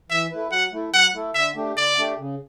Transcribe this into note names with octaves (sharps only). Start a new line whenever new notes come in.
E3 E5
A3 E4 B4
F#3 F#5
A3 E4 A4
F#3 F#5
A3 E4 A4
D3 E5
A3 D4 G4
D3 D5
A3 D4 G4
C#3